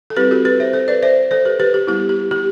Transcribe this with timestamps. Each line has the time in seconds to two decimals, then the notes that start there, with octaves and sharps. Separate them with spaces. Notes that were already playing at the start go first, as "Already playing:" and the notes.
0.10 A4
0.16 G3 C4 E4 G4 B4
0.31 F#4 A4
0.45 G4 B4
0.60 C5 E5
0.73 A4 C5
0.88 B4 D5
1.02 C5 E5
1.31 A4 C5
1.45 G4 B4
1.60 G4 B4
1.74 G4
1.87 G3 B3 E4 G4
2.09 G4
2.31 G4